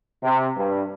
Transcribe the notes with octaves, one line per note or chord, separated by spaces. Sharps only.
C3
G2